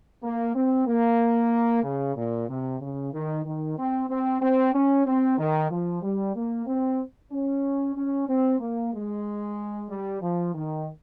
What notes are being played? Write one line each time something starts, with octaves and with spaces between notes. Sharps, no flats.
A#3
C4
A#3
C#3
A#2
C3
C#3
D#3
D#3
C4
C4
C4
C#4
C4
D#3
F3
G3
A#3
C4
C#4
C#4
C4
A#3
G#3
G3
F3
D#3